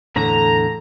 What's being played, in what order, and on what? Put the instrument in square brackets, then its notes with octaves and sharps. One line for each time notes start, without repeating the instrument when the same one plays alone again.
[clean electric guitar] E2 A2 D3 [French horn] A4 [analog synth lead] A#5